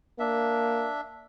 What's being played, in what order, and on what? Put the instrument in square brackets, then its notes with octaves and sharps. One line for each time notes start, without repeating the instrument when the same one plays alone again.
[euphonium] A#3 [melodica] D4 E5